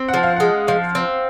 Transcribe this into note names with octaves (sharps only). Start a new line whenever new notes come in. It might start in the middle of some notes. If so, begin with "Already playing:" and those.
Already playing: C4
F#5
F3
F5
G#3 F#5
F3 F5
C4